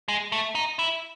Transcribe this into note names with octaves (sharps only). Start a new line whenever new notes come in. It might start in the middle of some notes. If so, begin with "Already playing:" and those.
G#3
A3
D#4
E4